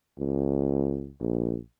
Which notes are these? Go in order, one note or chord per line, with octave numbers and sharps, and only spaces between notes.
C#2
A#1